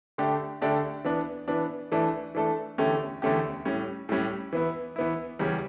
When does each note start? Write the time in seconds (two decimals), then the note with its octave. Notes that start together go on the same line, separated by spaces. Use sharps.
0.18 D3 A3 D4 G4
0.62 D3 A3 D4 G4
1.04 E3 B3 D4
1.48 E3 B3 D4
1.92 E3 A3 D4 A4
2.35 E3 A3 D4 A4
2.78 E2 D3 A3 C#4 G4
3.22 E2 D3 A3 C#4 G4
3.65 A2 G3 C#4
4.09 A2 G3 C#4
4.53 E3 B3 E4
4.96 E3 B3 E4
5.39 E2 C#3 G3 C#4